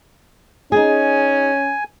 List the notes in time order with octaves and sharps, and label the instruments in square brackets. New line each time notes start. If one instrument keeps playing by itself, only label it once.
[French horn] C#4 [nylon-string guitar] D#4 G#4 [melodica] G#5